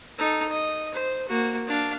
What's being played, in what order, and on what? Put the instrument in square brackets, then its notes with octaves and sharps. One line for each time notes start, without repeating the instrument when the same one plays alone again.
[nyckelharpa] D#4 A4
D#5
C5
A#3 F#4
D4 F5